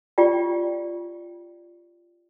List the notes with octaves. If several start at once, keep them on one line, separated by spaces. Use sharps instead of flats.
F4 G4 D5 G5